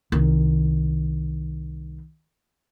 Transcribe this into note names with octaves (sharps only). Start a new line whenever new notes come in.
C2 D#3